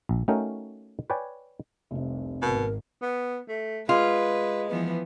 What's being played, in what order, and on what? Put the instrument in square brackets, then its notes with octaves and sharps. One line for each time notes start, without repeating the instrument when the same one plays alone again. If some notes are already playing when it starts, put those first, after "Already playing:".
[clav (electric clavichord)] A#1
A3 C#4 D#4 F#4 A#4 G5
B4 C#5 D5 G5 G#5
[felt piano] F1 C3 [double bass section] C2
[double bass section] G#1 [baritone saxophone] B2 [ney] A#4
[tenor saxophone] B3
A3
[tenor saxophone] G#3 [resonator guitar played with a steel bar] F4 [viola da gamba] B4
[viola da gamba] E3 F3 B3